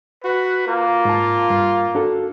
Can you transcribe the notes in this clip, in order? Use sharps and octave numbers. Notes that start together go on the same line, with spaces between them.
F#4 B4
A#3 F4
G#2 A5
G2
D4 F#4 A4